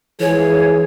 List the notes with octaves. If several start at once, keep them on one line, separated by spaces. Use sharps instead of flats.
E3 F3 G#3 G#4 C#5